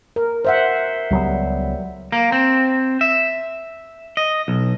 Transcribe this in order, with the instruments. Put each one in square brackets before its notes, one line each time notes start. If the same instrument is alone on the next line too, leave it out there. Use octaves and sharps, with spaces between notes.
[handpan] A#4
C5 E5 F#5
[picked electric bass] C#2 F#3 B3 [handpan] G3
[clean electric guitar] A#3
C4
E5
D#5
B1